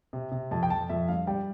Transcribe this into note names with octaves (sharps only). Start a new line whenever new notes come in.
C3
C3
F2 A5
G5
F2 A5
F2 E5
G2 F5
G3 G5